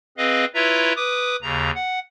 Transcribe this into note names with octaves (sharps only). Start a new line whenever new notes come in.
C4 G#4 B4 D#5 F5
E4 F4 B4 C#5 E5 A#5
B4 D6 D#6
D#2 C#3 A#5
F#5